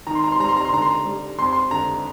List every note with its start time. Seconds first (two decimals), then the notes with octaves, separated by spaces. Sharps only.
0.07 D#3 A#5
0.15 C6
0.24 A#5
0.32 C6
0.40 G3 A#5
0.49 C6
0.57 A#5
0.65 C6
0.72 D3 A#5
0.82 C6
0.91 A#5
1.05 G3
1.38 F2 C6
1.53 C6
1.71 D3 A#5